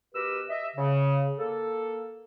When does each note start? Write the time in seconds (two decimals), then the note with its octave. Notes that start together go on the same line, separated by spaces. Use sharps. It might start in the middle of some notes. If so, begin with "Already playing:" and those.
0.13 B2 G4 A#4 B4 E6
0.48 D#5 E5
0.76 C#3
1.38 A#3 A4